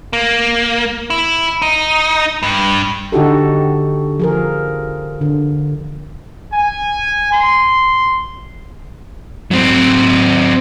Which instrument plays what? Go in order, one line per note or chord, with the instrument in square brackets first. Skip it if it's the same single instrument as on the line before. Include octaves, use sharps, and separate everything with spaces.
[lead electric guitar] A#3
E4
D#4
G2
[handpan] D3 D#4 F#4 G4 A4
F3 G#4 A#4
D3
[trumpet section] G#5
C6
[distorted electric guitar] F#3 C4